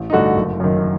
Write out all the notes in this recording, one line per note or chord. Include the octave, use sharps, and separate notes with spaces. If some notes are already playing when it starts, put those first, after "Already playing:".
Already playing: A1
D#4
G2 D3 A3 F#4
F#1
F#2 D#3